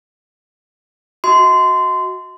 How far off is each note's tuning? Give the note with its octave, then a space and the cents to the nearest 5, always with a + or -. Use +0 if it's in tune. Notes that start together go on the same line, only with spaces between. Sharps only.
F#4 +0 D#5 +45 C6 -20